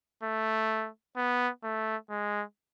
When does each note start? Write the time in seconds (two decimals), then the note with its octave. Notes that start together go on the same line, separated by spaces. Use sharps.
0.23 A3
1.17 B3
1.64 A3
2.10 G#3